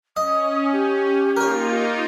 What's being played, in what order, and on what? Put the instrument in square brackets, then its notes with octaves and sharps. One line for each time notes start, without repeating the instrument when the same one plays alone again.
[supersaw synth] C#4 [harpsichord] D#5 [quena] D#6
[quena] G4
[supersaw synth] A#3 D#4 F4 [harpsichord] A#4 C#5